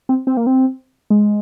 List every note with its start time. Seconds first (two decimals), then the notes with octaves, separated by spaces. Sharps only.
0.09 C4
0.27 C4
0.37 A#3
0.47 C4
1.10 G#3